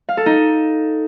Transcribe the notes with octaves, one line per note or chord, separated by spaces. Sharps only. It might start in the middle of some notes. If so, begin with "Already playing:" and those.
F5
A4
D#4